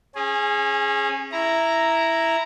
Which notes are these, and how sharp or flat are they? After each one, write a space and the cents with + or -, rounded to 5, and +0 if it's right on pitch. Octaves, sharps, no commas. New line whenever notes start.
C#4 -30 G#4 +0
E4 +0 A#5 +0